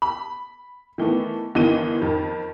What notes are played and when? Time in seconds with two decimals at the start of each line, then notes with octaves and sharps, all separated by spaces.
0.02 B5
0.98 D#3 E3 A3 B3
1.55 G1 D#3 E3 D#5 D#7
2.01 F2 D#3